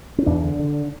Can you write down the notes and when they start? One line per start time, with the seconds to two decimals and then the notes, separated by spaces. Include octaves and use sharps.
0.18 C#4
0.26 E2 D4
0.43 D3
0.59 D3